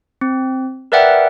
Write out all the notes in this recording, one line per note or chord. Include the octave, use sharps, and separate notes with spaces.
C4
A#4 B4 D5 E5 F#5 G5